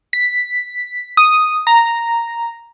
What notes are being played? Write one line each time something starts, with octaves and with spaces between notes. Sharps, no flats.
B6
D#6
A#5